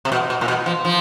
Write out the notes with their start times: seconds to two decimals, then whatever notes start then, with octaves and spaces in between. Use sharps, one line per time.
0.05 C3
0.12 B2
0.30 B2
0.41 A#2
0.48 B2
0.66 F3
0.85 F3